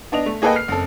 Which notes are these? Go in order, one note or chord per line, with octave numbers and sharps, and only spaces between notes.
B3 D4 D#5 F7
A3
A#3 G#4 A4 B4 D#5 G5
F6 C7
F#1 C4 A4